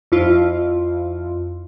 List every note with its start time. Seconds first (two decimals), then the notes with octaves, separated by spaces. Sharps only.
0.12 F2 E4 F4